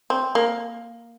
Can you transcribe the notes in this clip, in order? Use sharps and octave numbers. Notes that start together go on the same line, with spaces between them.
C4
A#3